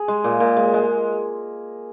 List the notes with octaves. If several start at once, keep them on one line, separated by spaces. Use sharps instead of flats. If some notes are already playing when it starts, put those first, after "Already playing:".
Already playing: G#4
G#3
A#2
A#2
G#3
G#3